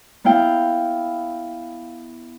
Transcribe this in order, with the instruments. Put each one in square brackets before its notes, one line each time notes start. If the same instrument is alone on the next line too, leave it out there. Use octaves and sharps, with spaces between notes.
[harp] B3 E4 F5 G5